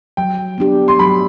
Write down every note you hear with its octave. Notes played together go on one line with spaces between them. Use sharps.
F#3 G5
B3 D4 G4
C6
F#3 B5